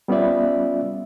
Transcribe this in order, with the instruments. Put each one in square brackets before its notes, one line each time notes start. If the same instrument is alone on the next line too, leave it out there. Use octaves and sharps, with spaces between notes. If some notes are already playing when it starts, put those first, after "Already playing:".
[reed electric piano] G3 B3 C#4 F4 D5 E5